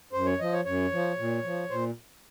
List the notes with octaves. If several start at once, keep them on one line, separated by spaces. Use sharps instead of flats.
F#2 C5
C#5
F3 D#5
C#5
F#2 C#5
F3
A#2
F3
A#2 C5